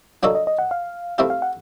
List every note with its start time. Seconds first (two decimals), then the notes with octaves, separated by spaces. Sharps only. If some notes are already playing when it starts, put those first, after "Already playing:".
0.23 F#3 A#3 D4 F#4 A4 D#5
0.35 D#5
0.47 D#5
0.59 F#5
0.71 F5
1.18 A3 C4 E4 G4 F5
1.30 F5
1.42 F#5